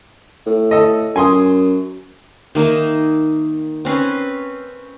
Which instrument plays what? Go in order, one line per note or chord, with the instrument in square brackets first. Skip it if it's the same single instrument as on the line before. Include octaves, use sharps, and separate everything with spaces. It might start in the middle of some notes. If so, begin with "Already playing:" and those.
[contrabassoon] A2
[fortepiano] A4 D#5
[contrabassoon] F#2 [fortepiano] G#5 C6 D#6
[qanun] D#3 A#3 D#4 E5
C4 C#4 B4